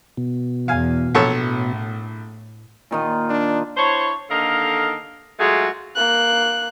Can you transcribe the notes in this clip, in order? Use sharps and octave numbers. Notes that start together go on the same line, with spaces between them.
B2
E2 F5 G#5
A#1 A2 A4 C#5
A#2 D#3 F4
D4
D4 E4 C5 C#5
D#2 D3 A4 A#4 D#5 F5
F#3 G#3 A3 F4 G#4
A#3 F#6